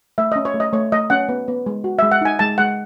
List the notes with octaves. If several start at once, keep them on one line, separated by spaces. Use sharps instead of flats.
A3 E5
C#4 D#5
C#5
A3
D#5
A3 C#5
A3 D#5
C#4 F#5
B3
B3
G#3
F#4
G#3 E5
F#5
D#4 G#5
G#3 A5
G#3 F#5